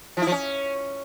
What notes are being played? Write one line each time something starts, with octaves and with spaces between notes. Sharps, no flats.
F3
E4
F3
C#4